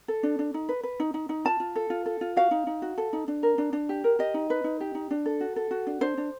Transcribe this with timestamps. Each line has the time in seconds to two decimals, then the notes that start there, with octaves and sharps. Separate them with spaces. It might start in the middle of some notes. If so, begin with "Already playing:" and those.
0.08 A4
0.23 D4
0.39 D4
0.54 D#4
0.69 B4
0.84 B4
1.00 D#4
1.14 D#4
1.29 D#4
1.45 F4 A5
1.60 F4
1.76 A4
1.90 F4
2.06 A4
2.21 F4
2.37 F#4 F5
2.51 D#4
2.67 D#4
2.82 F#4
2.98 A4
3.13 D#4
3.28 D4
3.43 A#4
3.58 D4
3.73 D4
3.89 G4
4.04 A#4
4.19 G4 D#5
4.34 D#4
4.50 B4
4.64 D#4
4.81 G4
4.95 D#4
5.11 D4
5.26 A4
5.41 F#4
5.56 A4
5.71 F#4
5.87 D4
6.01 D4 C5
6.18 D4